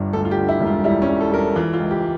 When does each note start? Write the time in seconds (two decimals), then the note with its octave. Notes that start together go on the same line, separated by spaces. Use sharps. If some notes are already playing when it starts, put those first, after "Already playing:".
Already playing: G1 G2
0.13 D2 A4
0.25 F4
0.31 G4
0.37 D3
0.49 E4
0.60 E1
0.67 F4
0.84 G3 E4
1.02 C#4
1.08 G3
1.21 A4
1.32 G3 A#4
1.38 A4
1.56 E3 F4
1.73 F4
1.79 C#2
1.91 G4